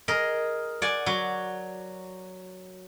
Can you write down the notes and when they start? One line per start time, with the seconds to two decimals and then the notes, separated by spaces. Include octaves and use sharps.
0.08 G#4 A#4 D#5
0.82 D5 F#5 G#5
1.06 F#3